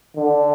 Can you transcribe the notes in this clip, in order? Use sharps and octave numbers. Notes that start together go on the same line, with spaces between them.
D3